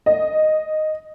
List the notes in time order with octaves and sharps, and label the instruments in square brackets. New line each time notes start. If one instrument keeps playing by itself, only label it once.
[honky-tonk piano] D#5